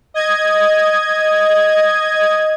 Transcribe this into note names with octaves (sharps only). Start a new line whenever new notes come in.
D#5 G#6